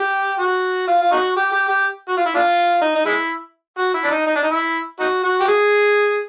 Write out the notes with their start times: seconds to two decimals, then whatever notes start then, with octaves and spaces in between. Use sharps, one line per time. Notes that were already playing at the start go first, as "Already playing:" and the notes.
Already playing: G4
0.39 F#4
0.88 F4
1.01 F4
1.12 D#4 F#4
1.36 G4
1.52 G4
1.69 G4
2.09 F#4
2.17 F4
2.26 E4
2.34 D4 F4
2.81 D#4
2.95 D#4
3.05 G#3 E4
3.78 F#4
3.94 E4
4.04 D4
4.11 D#4
4.27 D#4
4.35 D4
4.43 D#4
4.51 E4
5.00 D#4 F#4
5.24 F#4
5.40 G4
5.48 G#4